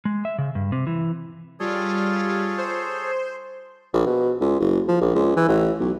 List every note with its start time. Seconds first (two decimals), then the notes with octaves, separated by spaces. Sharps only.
0.05 G#3
0.25 E5
0.39 C#3
0.55 G2
0.72 C3
0.87 E3
1.60 G3 F4 G#4 A4 C#5
2.58 C5
3.94 A#1
4.07 B2
4.41 C#2
4.60 F#1
4.88 F3
5.01 A#1
5.15 C#2
5.36 E3
5.48 A1
5.80 B1